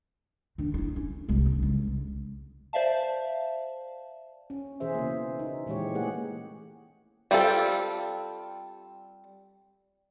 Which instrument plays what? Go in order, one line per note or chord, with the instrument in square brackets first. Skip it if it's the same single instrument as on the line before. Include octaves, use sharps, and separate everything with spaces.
[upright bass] D#3 D4
D4 E4
C#4
C2 G#3
D3
C#2
[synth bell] C5 D5 E5 F5 A5
[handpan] C#4
B2 E3 G#4 C5 E5
C#3 A#3
D#4
A#2 E3 G#3 G4 C#5
A3 A#3 G4 G#4 F#5
[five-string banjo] G3 C4 F4 A4